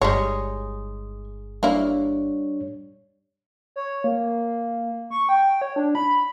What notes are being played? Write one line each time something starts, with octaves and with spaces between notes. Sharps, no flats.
G1 G3 G#3 D#4 C#5
G3 A#3 D4 E4 C#5
C#5
A#3
C#6
G5
C#5
D4
B5